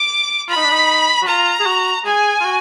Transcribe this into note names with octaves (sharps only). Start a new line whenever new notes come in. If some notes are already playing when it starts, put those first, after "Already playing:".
Already playing: D6
F4 B5
D#4
D4
D#4
F#4
F4 A#5
G#4
F#4
G#4 G#5
F4
F#4